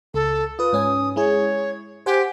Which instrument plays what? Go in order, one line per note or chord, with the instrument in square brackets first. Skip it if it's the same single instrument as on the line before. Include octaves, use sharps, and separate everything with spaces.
[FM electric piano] C#2 [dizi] A4
[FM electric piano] F4 B4 [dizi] D#6
[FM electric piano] G#2 C#4 G#5
[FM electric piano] G#3 E4 G#4 [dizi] C#5
[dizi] G4 [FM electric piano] C5 F#5 G#5